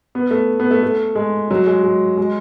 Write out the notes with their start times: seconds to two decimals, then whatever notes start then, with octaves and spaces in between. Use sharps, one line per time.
0.15 B3
0.31 A3
0.60 B3
0.71 A3
0.83 A3
1.15 G#3
1.51 F#3
1.67 G#3
1.83 G#3
2.17 G#3